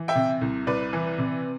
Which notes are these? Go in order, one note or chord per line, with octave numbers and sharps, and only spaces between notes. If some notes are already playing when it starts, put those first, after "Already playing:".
Already playing: E3
E5 G5
C3
C2
C2 B4 D5
E3
C3